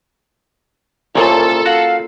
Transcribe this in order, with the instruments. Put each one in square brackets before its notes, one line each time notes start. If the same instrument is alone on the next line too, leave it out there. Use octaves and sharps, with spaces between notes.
[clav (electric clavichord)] C2 A#2 C#3 [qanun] A#3 C#4 F4 [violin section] A4
[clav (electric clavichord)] F#4 F#5 [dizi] F5